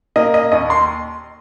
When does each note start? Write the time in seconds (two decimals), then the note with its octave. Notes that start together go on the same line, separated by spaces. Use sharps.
0.16 A#3 D#5
0.34 D#5
0.52 D#2 D#5
0.70 C6